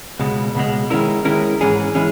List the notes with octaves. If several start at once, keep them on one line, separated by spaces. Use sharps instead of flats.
C#2 B2 G#3
C#2 B2 G#3
D#3 G#3 C#4 E4 A#4
D#3 G#3 C#4 E4 A#4
G#2 E3 G#3 C#4 G#4
E3 G#3 C#4 G#4